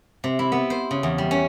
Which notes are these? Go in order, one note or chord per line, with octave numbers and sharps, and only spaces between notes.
C3
E4
B3
C5
C#3
E2
G3
C#4